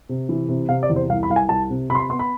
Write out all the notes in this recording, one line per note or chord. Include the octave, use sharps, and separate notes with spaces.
C3
E3
C3
C3 F5
D5
E2
C5
C2 F5
B5
C2 F5
G#5
C2 A5
C3
C3 B5
C6
B5
B3 C6
B5